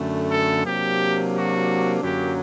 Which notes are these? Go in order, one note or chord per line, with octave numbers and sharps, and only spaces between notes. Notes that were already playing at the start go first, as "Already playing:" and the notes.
Already playing: F#2 D3 A3
A4
C3 F#3 A#3 D4 G4
F#4
F#2 D3 F#3 A#3 G4